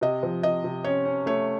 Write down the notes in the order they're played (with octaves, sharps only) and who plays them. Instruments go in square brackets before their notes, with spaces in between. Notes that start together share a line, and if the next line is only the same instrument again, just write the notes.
[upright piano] C3 [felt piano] D#5
[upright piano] F3
[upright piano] C3 [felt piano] D#5
[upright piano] C3
[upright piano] C#4 [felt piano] C#5
[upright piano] C#4
[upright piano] A3 [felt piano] C#5